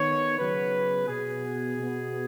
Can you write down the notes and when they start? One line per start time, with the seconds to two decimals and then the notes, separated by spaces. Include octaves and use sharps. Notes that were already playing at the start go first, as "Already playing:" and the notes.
Already playing: D#3 B3 C#5
0.38 C#3 F#3 B3 B4
1.08 B2 B3 G#4
1.77 B2 B3